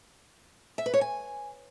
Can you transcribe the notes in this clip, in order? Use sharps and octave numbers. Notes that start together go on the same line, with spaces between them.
E5
B4
C#5
G#5